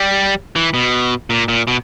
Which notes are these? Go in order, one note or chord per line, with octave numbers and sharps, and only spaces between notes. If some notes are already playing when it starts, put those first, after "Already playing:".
Already playing: G3
E3
B2
A#2
A#2
B2